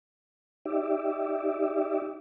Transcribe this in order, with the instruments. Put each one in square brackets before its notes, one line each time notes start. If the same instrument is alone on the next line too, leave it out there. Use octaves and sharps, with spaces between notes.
[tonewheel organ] D#4 G4 D5 E5